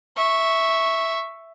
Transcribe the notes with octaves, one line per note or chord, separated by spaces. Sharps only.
E5 C#6